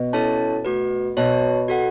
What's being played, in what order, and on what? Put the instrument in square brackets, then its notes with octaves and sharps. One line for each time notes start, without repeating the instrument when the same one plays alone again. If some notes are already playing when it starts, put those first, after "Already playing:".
Already playing: [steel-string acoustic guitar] B2
[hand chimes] C#4 E4 A4 C#5 A5
A3 F#4 B4
[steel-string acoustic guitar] B2 [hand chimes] F#4 C#5 A5
[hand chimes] F#4 A4 F#5